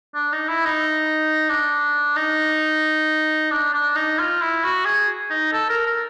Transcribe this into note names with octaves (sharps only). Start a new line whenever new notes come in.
D4
D#4
E4
D#4
D4
D#4
D4
D4
D#4
F4
E4
F#4
G#4
D#4
A4
A#4
A#4